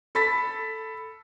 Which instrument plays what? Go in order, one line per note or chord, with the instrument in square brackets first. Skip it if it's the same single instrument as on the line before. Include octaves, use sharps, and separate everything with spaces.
[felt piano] A4 B5 A6 B6